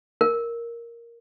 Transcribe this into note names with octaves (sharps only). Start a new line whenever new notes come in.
A#4